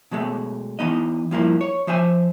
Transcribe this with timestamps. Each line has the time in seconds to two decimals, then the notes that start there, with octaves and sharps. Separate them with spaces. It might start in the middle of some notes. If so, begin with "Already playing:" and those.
0.11 B2 F#3 G#3 A3
0.79 E2 E3 B3 D#4 D#5
1.31 G2 F3 A#3 E4
1.61 C#5
1.87 F3 C5 E5 G#5